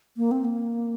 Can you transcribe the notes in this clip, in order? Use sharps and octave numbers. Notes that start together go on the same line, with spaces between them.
A#3
C4
A#3